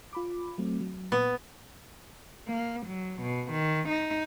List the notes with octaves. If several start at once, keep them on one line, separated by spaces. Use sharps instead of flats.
F4 B5 D6
F#3 A3 C4
F#3
A#2 B3
A#3
F#3
B2
D#3
D#4